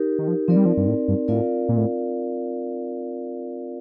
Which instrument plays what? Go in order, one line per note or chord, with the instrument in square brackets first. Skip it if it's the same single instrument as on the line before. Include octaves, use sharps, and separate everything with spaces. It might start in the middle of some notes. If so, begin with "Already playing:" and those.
Already playing: [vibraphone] D#4 G4 A#4
[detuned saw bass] D#3
F3
[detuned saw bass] F3 [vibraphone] C4 D#4 A#4 D5
[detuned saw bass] G3
F3
G2
A2
G2
[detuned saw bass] A2 [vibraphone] C4 F4 A#4 D5 F5
[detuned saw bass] A#2
A2